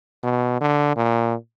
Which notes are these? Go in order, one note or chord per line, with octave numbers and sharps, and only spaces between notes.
B2
D3
A#2